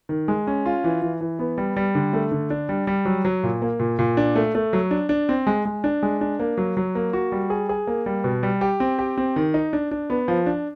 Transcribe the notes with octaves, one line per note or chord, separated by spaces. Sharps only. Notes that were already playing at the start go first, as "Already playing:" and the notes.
D#3
G#3
C#4
F4
E3
E3
E3
B3
G3
G3
D3
A3
D3
D4
G3
G3
F#3
F#3
A#2
A#3
A#2
A#2
D4
A3
A3
F#3
D4
D4
C4
G#3
G#3
D4
G#3
D4
A#3
F#3
F#3
A#3
F#4
G3
G#4
G#4
A#3
G3
B2
G3
G4
C4
G4
C4
D#3
D#4
D4
D4
B3
F3
D4